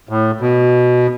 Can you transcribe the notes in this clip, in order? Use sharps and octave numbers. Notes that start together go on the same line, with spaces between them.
A2
B2